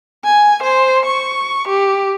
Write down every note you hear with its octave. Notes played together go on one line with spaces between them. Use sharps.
G#5
C5
C#6
G4